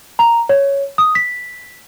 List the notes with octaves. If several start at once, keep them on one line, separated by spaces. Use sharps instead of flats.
A#5
C#5
D#6
B6